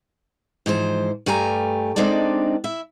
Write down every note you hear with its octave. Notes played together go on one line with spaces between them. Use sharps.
G#2 E3 F3 C5
G2 A3 G4 G#5 A#5
G#3 C4 D4 D#4 A4 D5
E4 E5